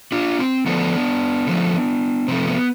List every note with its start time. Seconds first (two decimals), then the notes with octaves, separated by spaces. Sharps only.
0.12 D4 F4
0.38 C4
0.66 D3 F3 A3 B3 D4
1.47 D3 F3 A3
2.28 C3 F3 A3 C4
2.48 B3